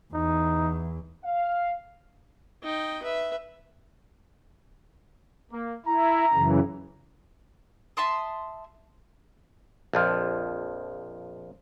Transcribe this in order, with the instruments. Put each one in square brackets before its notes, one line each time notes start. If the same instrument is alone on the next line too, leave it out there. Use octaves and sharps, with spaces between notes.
[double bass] E2 [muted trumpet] D#4
[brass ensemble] F5
[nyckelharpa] D#4 G5
B4 E5
[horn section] A#3
[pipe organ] E4 [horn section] A#5
[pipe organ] F#2 C#3 E3
[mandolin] E5 A5 C6 D#6
[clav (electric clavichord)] A#1 F2 F3